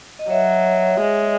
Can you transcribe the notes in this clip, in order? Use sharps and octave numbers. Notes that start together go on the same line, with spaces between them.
D#5
F#3 C#5 E5
G#3